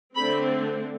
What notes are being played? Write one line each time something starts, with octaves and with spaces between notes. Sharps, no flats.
D3 A3 C4 B5